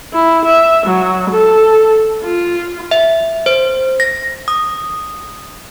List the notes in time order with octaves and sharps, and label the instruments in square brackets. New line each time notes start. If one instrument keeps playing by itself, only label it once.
[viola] E4
E5
F#3
A4
F4
[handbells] E5
C5
A#6
D#6